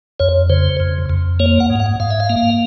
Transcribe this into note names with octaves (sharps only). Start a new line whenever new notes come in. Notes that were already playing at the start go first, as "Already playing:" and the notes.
F2 C#5
C#3 C5
F2
F2
A#3 C#5
F#5
G#2
F#5
G#2 F5
E5
F5
A#3